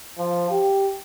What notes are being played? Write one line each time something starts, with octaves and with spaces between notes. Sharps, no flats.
F3
G4